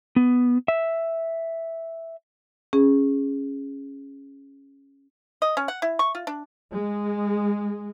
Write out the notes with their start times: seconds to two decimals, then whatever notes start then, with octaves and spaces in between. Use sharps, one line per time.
0.16 B3
0.68 E5
2.73 C#4 G#4
5.42 D#5
5.57 C#4
5.68 F#5
5.82 E4
5.99 C#6
6.15 F4
6.27 D4
6.71 G#3